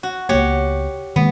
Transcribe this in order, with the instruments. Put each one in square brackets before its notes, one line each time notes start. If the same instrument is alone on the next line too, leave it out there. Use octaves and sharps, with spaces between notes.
[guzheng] F#4
[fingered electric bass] C#2 A#3 B3 [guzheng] F#4 G4 C#5
[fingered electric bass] D#3 G#3 A#3 [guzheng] B3